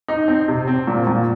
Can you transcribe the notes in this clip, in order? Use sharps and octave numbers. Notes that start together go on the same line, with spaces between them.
D#4
C4
C3
C4
A#2
A#2